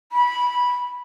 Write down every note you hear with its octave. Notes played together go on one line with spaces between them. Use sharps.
B5